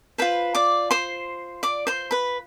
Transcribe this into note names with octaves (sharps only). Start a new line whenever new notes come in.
F4 B4 C5 B5
D5 D6
C5 C6
D5 D6
C5 C6
B4 B5